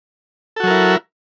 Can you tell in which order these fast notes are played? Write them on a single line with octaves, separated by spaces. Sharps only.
A4 F#4 F#3 A#4 E4